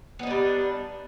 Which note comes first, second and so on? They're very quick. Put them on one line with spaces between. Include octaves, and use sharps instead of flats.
B3 D#4 D4 G3